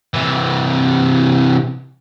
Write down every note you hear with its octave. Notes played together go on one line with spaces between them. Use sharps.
C3 E3